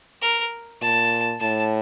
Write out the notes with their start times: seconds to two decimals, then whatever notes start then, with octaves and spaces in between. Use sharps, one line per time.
0.22 A#4
0.81 A#2 A5
1.40 A2 A5